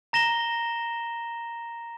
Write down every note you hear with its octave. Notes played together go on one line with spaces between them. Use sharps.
A#5 A#6 E7 G7